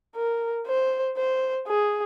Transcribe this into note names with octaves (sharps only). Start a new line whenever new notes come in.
A#4
C5
C5
G#4